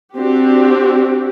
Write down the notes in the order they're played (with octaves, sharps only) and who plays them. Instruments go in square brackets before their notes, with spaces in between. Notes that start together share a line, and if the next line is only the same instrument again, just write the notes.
[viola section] C4 D4 F#4 G4